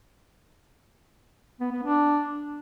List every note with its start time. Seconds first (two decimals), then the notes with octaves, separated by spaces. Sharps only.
1.60 B3
1.72 B3
1.83 D4